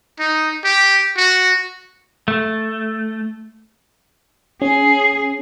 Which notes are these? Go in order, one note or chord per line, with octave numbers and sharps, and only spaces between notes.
D#4
G4
F#4
A3
C#4 G#4